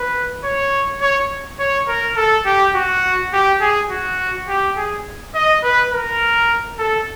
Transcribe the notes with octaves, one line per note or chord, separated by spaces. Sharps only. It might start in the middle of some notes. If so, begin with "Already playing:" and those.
Already playing: B4
C#5
C#5
C#5
A#4
A4
G4
F#4
G4
G#4
F#4
G4
G#4
D#5
B4
A#4
A4